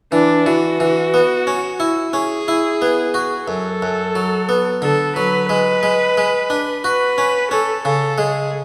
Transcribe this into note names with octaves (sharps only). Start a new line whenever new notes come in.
E3 D4
E3 F#4
E3
B3
C#4
E4
C#4 G#4
E4
B3
F#4
F#2 A4
F#2
F#3
B3
D3 A4
F#3 B4
G#3 B4
G#3
G#3
D4
F#4 B4
C#4
C#4 A4
C#3 A4
G#3 G#4